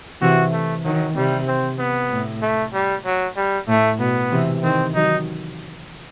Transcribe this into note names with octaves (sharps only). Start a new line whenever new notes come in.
C3 E3 F#4
A3
D#3 F#3
C3 G3
C4
B3
A2
A3
G3
F#3
G3
A2 A3
B2 B3
C3 E3
D#3 C4
D#3 F#3 D#4